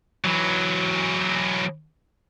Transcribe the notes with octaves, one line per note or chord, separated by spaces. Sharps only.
E3 F#3